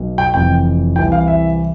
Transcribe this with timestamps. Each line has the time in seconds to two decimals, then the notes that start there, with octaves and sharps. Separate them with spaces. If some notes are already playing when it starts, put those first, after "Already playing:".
Already playing: B1 B2
0.18 G5
0.33 F1 F2 E3 G5
0.96 C2 C3 E3 G5
1.12 F5
1.28 E5